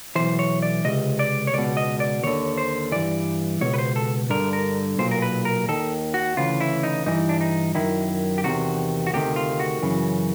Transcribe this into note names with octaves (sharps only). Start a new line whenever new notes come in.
B1 A2 E3 C5
C#5
D5
C#2 C3 D#5
D5
C#5
C#2 B2 D5
D#5
D5
D#2 D3 C#5
C5
G2 E3 D5
C#2 B2 C#5
B4
C5
A4
G2 D3 A#4
A#4
B1 A#2 C5
A#4
B4
A#4
D#2 D#3 A4
F#4
D2 C#3 E3 F4
E4
D#4
G2 E3 D#4
D4
D#4
F#2 D#3 E4
G4
E2 C3 D#3 F#4
F#4
D2 C3 D#3 G4
F4
F#4
F#2 C#3 E3